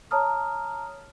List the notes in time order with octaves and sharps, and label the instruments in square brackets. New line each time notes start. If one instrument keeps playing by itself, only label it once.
[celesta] C#5 A5 A#5 D#6 F6